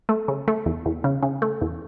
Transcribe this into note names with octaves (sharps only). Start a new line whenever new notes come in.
A3
C#3
A3
E2
E2
C#3
C#3
A3
E2